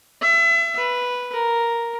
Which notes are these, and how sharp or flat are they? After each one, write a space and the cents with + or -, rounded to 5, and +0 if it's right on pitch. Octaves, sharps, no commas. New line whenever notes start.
E5 +30
B4 -5
A#4 +0